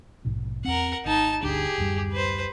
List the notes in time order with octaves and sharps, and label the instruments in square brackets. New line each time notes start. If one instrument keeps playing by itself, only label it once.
[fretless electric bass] A#1 G#2 B2
[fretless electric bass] E2 C4 [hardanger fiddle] A#4 F#5
[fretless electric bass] G#1 [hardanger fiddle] D#4 A5
[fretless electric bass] G1 D2 D4 [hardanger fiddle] G4 G#4
[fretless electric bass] D1 F#2 G3
[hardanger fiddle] B4 C5